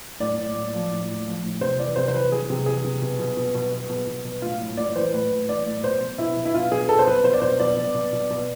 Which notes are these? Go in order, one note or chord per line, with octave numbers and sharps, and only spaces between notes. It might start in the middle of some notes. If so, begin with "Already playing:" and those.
A2 D5
A2
A2
F3
A2
A2
F3
A2
C3 C5
E3 D5
C3 C5
C5
E3 B4
E3 G#4
C3
E3 G#4
C3
B2
B2
B2
B2
B2
B2
B2
B2
A2 F4
A2
A2 D5
D5
E3 C5
A2 B4
A2
E3 D5
A2
B2 C5
B2
B2 E4
B2
E4
B2 F4
B2 G#4
B2 A4
C5
B2 B4
B2 C5
D5
B2 C5
B2 D5
B2
B2
B2
B2